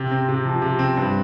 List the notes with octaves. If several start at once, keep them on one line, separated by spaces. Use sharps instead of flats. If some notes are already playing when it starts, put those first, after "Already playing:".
Already playing: C3
C4
C3
F3
C3
C4
G2